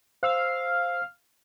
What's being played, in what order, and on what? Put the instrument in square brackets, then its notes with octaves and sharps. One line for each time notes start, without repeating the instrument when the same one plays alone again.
[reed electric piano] C5 E6 [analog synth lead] F5